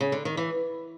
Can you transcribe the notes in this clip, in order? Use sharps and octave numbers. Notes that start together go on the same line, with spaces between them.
C#3
D3
D#3
E3